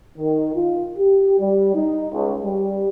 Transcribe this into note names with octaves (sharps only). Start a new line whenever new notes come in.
D#3
F4
G4
G3
D#4
C#2
G3